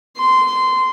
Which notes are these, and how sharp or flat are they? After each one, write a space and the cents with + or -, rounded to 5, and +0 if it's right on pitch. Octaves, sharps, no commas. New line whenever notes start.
C6 -15